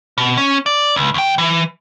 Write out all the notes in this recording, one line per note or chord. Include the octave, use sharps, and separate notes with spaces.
B2
C#4
D5
C#2
D#2 G5
E3